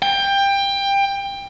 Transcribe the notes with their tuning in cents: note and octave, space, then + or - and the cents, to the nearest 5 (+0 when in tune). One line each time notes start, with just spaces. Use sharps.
G5 +20